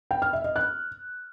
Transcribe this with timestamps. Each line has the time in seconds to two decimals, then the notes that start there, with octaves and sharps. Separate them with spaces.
0.11 G5
0.22 F6
0.33 E5
0.44 D#5
0.56 F#6